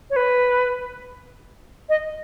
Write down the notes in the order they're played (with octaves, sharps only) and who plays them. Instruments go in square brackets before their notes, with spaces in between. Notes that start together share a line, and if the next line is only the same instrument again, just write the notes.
[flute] C#5
B4
D#5